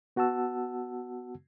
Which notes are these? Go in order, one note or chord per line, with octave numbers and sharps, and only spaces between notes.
B3 F#4 F#5 A5 E6